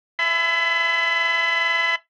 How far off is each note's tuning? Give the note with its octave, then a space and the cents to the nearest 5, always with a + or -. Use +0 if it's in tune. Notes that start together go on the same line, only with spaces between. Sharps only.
E5 +15 G#5 +35 B5 +35